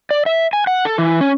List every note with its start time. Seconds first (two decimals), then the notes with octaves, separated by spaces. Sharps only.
0.11 D5
0.26 E5
0.53 G#5
0.67 F#5
0.85 A4
0.98 E3
1.21 C#4